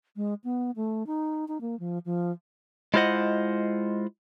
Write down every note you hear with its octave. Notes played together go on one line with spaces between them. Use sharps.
G#3
B3
A3
D#4
D#4
A#3
F3
F3
G#3 E4 F4 C5 D#5 F#5